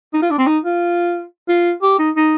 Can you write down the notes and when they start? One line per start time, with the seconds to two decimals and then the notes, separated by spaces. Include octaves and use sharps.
0.14 D#4
0.22 F4
0.31 D4
0.38 C4
0.47 D#4
0.65 F4
1.49 F4
1.82 G4
1.99 D#4
2.16 D#4